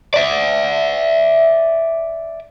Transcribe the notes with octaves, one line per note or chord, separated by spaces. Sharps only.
D5 E5